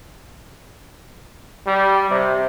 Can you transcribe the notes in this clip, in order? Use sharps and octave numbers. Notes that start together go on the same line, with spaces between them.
G3
C3